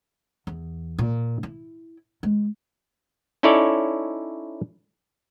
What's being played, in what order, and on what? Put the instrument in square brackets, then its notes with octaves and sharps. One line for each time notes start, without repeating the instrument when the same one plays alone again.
[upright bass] E2
A#2
E4
G#3
[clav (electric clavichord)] C#4 D#4 E4 A4 C#5 D5